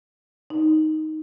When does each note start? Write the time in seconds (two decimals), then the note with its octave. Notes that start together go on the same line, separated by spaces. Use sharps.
0.50 D#4